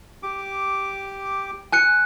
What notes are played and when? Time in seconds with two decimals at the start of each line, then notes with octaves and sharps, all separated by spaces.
0.23 G4 D6
1.73 G#5 F#6 C#7